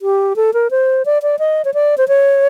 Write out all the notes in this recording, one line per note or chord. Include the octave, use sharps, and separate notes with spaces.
G4
A4
A#4
C5
D5
D5
D#5
C#5
D5
C5
C#5